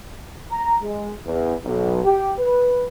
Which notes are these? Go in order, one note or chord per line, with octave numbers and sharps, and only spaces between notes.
A#5
G#3
E2
B1
G4
B4